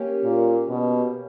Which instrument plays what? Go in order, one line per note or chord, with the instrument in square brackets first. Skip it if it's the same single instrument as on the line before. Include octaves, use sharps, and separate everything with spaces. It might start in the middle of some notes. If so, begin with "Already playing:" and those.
Already playing: [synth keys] A#3 C#4 G4
[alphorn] A#2
B2